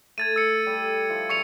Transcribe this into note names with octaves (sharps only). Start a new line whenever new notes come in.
A3 G#6 A6 D#7
E6 C#7
G3 A4
F3 E4
G2 G#4 F5 C#6 C#7 F7